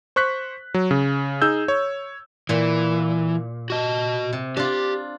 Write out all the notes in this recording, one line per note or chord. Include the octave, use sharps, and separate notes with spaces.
C5 C#6 F#6 B6
F#3
C#3
D#4 G#4 E6 G6
C#5
A#2 E3
F#4 D#5
C3
D4 F4 G4